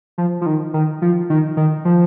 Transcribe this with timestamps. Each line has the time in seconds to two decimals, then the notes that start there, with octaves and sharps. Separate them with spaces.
0.18 F3
0.41 F3
0.46 D#3
0.74 D#3
1.02 F3
1.30 D#3
1.57 D#3
1.85 F3